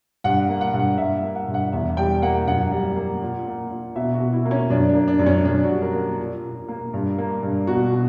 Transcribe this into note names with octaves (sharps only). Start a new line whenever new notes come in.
G2 F#5
A#3
F#5
G2
F#5
G2 E5
A#3
F#5
G2
F#5
E2 E5
G3 G5
A#3 F#5
F#2 F#5
G3
A#3
A#2
A#3
A#2
B2 E5
F#4
B2
E4
A#3
C#4
F#2 D4
D4
A#3
D4
F#2
C#4
F#2 D4
F#4
G3
A#4
A#3
A#2
A#2
A#3
G2
A#3
G2
B2 F#4
B2